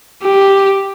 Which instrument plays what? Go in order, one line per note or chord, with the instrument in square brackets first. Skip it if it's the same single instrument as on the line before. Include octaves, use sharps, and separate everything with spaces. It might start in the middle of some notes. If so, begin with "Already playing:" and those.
[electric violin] G4